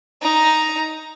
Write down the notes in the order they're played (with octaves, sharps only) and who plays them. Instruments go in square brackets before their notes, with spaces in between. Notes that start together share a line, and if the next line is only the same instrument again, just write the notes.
[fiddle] D#4 A#5